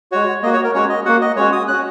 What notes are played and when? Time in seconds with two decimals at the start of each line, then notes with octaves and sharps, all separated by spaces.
0.12 G#3 F#4 C#5
0.43 A#3 D#5
0.47 F#4
0.53 C#5
0.64 A#4
0.74 G#3 C#4 F#4 C#5
0.89 D#5
1.05 A#3 F#4 F#5
1.21 D#5
1.36 G#3 C#4 F#4 C#5
1.52 D#6
1.68 C#4 F#4 F#6